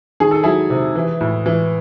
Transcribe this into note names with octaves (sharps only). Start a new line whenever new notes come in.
D#3 G#4
A4
F#3 E4 G#4
C3
E3
A2
E3